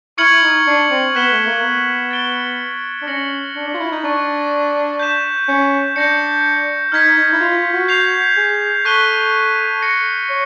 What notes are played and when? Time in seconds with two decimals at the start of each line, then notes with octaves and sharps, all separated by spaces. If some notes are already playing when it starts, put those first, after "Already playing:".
0.18 E4 C#6 F6 G#6 C#7 F#7
0.42 D#4
0.67 D4
0.90 C4
1.15 B3 F#6 B6 E7 G7
1.31 A3
1.47 A#3
1.63 B3
2.11 A6 D7 G7
3.02 D4
3.07 C#4 F6 A#6 C#7 F#7
3.55 D4
3.67 D4
3.74 F4
3.79 E4
3.92 D#4
4.03 D4 C#6 F#6 A6
4.99 G6 B6 E7
5.48 C#4
5.96 D4 G6 A#6 C#7
6.92 D#4 F6 G#6 B6
7.17 D#4
7.33 E4
7.41 F4
7.57 F4
7.73 F#4
7.88 G6 C7 F7
8.37 G#4
8.85 A4 C#6 F#6 B6 D#7 G7
9.82 F6 A#6 C#7
10.29 C#5